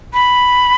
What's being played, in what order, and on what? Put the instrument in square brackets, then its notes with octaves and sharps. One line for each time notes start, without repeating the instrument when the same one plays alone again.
[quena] B5